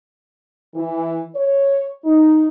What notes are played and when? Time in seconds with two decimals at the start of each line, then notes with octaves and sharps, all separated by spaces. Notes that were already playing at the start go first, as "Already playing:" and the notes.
0.75 E3
1.36 C#5
2.05 D#4